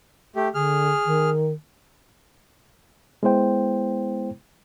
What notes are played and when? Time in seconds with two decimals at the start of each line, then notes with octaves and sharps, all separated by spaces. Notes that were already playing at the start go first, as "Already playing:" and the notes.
0.36 A3 G4
0.54 D3 G#4 F6
1.06 D#3
3.23 G#3 B3 E4 C5 G5